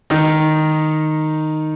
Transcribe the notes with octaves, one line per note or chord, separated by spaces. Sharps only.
D#3 D#4